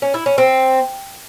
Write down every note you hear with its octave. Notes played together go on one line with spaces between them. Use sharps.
C#4
E4
C#4
C4